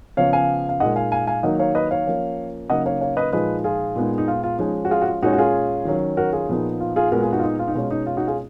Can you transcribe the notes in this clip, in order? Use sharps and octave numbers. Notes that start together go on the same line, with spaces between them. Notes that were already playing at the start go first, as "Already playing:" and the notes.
C#3 F3 B3 C#5 F5
F5 G#5
F5
A#2 G#3 D#4 D#5 F#5
F5 G#5
F5 G#5
F5 G#5
D#3 F#3 A#3 D#4 D#5 F#5
C#5 F5
B4 D#5
C#5 F5
F3 A#3 C#4
C#3 F#3 A#3 D#4 D#5 F#5
C#5 F5
C#5 F5
B4 D#5
A#2 F3 G#3 D#4 B4 D#5
F4 G#4
A#2 G#3 B3 D#4
D#4
F4
F4
F3 G#3 C#4 D#4
F#4
F4 G#4
F#4
F4
A#2 G#3 C#4 D#4 F#4
F#4
F4 G#4
D#3 F#3 C#4
F#4 A#4
F4 G#4
A#2 F3 B3 D#4
F4
F4 G#4
A#2 G#3 B3 F#4 A#4
F4 G#4
D#4 F#4
F4
D#4
F4
D#4
B2 G#3 C#4 F4
D#4
F4
D#4 F#4
F4 G#4